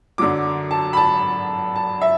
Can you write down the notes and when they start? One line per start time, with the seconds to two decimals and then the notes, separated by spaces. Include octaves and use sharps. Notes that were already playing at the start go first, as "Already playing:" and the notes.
0.18 F#2 D3 F#3 D6
0.71 A5
0.93 B5
0.97 A5
1.76 A5
2.01 E5